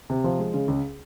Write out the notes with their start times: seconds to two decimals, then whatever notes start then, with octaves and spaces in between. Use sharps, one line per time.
0.10 C3
0.24 F3
0.39 G#3
0.54 C#3
0.68 C#2